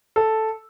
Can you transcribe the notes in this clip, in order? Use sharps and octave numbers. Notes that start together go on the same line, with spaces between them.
A4